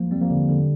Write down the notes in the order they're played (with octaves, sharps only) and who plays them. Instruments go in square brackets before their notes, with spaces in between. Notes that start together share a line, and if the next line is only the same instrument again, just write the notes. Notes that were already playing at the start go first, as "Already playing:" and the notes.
Already playing: [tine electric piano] F3 A#3
G3 C4
F3 A#3
D3 G3
D3 G3